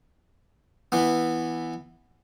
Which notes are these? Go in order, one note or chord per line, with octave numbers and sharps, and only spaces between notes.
E3 B3